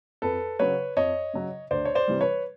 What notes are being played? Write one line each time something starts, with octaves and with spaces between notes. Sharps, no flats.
F2 A4 B4
C#3 F#3 B4 C#5
F2 C#5 D#5
C#3 F#3
D2 C5 D5
C#5
C5 D5
C3 E3 G3
B4 C#5